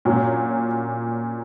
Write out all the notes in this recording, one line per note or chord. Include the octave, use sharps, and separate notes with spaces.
A#2 F#3 C#4